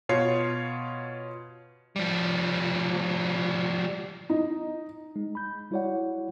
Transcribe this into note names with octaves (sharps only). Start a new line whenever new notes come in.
B2 F4 C#5 C7
F3 G3
D#4
G#3 D#4
B5 G6
G3 E4 F#4 C#5 D5 F#5